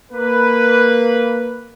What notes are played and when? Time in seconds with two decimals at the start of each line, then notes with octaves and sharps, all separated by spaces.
0.11 A#3 B4